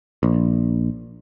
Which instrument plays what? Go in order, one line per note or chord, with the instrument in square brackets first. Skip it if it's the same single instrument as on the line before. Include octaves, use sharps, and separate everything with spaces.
[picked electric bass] A#1